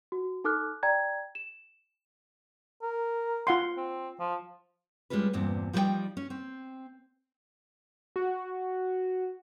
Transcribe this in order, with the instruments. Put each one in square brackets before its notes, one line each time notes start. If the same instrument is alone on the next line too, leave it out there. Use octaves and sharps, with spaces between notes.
[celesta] F#4
D#4 A4 D6 F6 F#6
D5 G5 A#5 G#6
E7
[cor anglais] A#4
[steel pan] F4 F#5 C6
[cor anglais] C4
F3
[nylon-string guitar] G3 G#3 A#3 C#4 F4 B4
E2 G2 A#2 C4
F3 G3 D#4 A4 D5 G5
C#4
C4
[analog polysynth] F#4